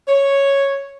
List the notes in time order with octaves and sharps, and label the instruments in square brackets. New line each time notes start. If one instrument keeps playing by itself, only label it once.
[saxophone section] C#5